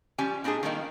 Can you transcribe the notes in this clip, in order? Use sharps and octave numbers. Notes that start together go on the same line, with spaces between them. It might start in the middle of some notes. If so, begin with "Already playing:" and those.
F3 G3 C#4 G4 G#5
A#2 C4 D4 D#4 G#4
D#3 F3 G3 A3 A#3 D#4